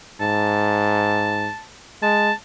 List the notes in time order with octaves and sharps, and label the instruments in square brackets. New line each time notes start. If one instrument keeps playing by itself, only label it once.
[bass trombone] G#2 [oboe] A5
[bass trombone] G#3 [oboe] A5